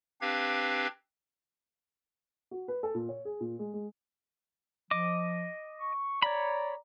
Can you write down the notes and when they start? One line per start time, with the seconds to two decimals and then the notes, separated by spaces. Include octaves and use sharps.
0.21 C4 D4 G4 B4 F5 G#6
2.51 F#4
2.68 B4
2.83 A4
2.95 A#2
3.09 C#5
3.25 G#4
3.40 A#2
3.59 G#3
3.74 G#3
4.91 F3 D#5 D6
5.80 C#6
6.22 C#5 D5 A#5 B5